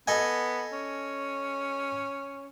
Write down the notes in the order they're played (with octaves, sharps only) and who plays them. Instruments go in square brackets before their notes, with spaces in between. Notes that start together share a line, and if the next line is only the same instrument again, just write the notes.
[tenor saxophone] B3 [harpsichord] A4 D#5 G#5
[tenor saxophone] C#4